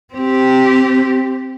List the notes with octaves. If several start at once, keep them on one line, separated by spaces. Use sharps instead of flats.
C4 G4